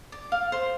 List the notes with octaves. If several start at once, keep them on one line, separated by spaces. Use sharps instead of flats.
D5
F5
C5